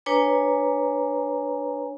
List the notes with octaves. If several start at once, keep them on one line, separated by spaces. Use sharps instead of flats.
D4 B4 C#5 G#5 A#5